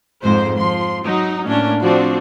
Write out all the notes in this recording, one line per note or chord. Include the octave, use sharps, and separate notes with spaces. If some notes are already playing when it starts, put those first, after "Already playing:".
F2 G#2 G#3 C5
F3 C6
F#3 D#4
A2 A#3 C#4 D4
F3 C4 D4 F#4